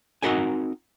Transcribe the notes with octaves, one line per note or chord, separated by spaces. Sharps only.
C4 D#4 F#4 A#4 F#5 G#5